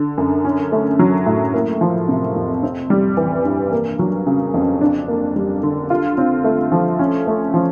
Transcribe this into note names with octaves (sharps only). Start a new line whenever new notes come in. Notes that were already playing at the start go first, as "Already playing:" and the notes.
Already playing: D3
F#2
C#4
A3
F#3
A2
A#3
F3
C3
F2
C4
G3
E3
G2
A#3
F#3
C#3
F2
D4
A#3
G3
D3
F4
C4
A3
F3
C#4
A3
F3